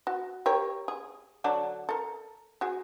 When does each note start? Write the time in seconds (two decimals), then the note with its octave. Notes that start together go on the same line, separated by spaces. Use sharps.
0.07 F#4
0.46 G4 A#4 C#5
0.88 G#4
1.44 D3 F#3 D4
1.89 A4 A#4
2.61 F#4 G#4